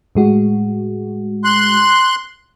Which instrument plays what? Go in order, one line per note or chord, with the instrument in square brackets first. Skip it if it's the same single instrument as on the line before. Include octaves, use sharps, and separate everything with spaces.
[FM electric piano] A2 G#3 F#4
[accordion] C6 F#6